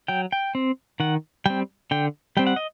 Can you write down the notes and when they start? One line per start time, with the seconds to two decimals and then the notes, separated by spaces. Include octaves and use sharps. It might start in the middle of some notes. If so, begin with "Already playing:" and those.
0.08 F#3 G5
0.32 G5
0.55 C4
1.00 D#3 F#5
1.46 G3 C4 G5
1.91 D3 G5
2.37 G3 C4 G5
2.47 F#5
2.56 D#5